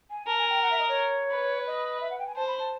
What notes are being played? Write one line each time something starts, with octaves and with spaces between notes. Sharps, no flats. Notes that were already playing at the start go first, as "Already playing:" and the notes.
G#5
A#4 A5
G#5
G5
F#5
E5
D#5
C#5
B4
D#5
E5
F#5
G5
G#5
C5 A5
B5
A5